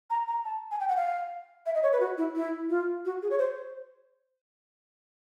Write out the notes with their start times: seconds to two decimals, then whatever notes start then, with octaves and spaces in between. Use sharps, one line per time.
0.10 A#5
0.28 A#5
0.45 A5
0.71 G#5
0.80 G5
0.88 F#5
0.97 F5
1.66 E5
1.75 D#5
1.83 C#5
1.92 B4
2.00 F#4
2.18 E4
2.36 E4
2.70 F4
3.05 F#4
3.22 G#4
3.30 C#5
3.39 C5